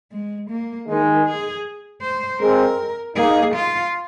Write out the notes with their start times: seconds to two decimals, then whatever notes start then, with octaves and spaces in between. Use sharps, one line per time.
0.12 G#3
0.50 A#3
0.88 D#3 G#3 D#4
1.26 G#4
2.02 C5
2.40 G#3 C4 A#4
3.16 A#3 D#4 G#4
3.55 F4